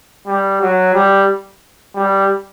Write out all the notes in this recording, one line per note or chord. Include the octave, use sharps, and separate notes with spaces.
G3
F#3
G3
G3